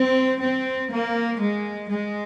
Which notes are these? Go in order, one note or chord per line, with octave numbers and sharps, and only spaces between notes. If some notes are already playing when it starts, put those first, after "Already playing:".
Already playing: C4
C4
A#3
G#3
G#3